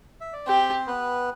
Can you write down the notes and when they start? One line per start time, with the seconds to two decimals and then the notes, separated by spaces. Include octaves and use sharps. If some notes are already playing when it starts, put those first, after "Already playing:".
0.21 E5
0.33 D5
0.47 C4 G4 C5
0.87 B3 B4